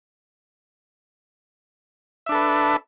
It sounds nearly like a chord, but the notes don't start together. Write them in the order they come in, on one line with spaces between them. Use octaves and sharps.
E5 D4 A4 B4